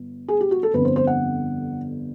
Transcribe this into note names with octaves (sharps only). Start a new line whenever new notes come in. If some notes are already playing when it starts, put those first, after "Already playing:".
Already playing: G1
G#4
G4
F#4
A4
G1 F2 D3 B4
C5
C5
F#5